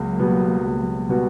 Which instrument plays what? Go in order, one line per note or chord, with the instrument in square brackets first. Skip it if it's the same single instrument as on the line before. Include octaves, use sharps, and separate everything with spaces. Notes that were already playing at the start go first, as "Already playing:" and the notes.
Already playing: [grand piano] C#2 [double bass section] F#3 A#3
[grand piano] B2 G3 B3 F#4
C#2
B2 G3 B3 F#4